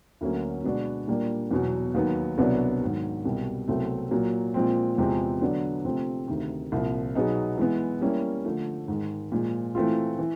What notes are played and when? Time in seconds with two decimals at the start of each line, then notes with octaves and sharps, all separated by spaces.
0.21 D2 D3 F#3 A#3 C#4
0.64 B2 G#3 B3 D4 F#4
1.08 A#2 G3 A#3 D4
1.51 E2 B2 F#3
1.94 D#2 D#3 F#3 B3
2.38 C2 B2 F#3 B3 D4
2.81 G#2 D#3 F#3
3.25 C2 B2 G3
3.68 C2 B2 F#3 A3 C4
4.11 A#2 F#3 A#3
4.54 A#2 F3 G#3 C4
4.98 E2 C3 F3 G#3 C4
5.41 D3 F#3 B3 D4
5.85 C3 F3 A3 C4
6.28 D2 C3 D#3
6.72 C2 A#2 F3
7.15 B2 F#3 B3 D#4 G#4
7.58 E3 G#3 B3
8.01 G3 A#3 C#4 E4
8.45 D3 F3 A3
8.88 G#2 D#3 G#3
9.32 A#2 F3 G#3
9.75 E3 A3 C4 F4
10.19 E3